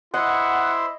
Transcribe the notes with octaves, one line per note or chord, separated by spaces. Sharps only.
E4 C5 D#5 F#5